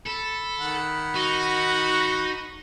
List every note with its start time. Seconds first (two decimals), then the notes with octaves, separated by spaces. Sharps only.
0.07 A4 B5
0.60 D#3 F#5
1.15 D#4 F#4